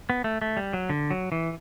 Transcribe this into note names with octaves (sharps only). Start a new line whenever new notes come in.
B3
A3
A3
G3
F#3
D3
F#3
E3